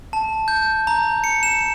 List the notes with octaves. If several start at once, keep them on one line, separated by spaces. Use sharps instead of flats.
A5
G6
A#5
C#7
E7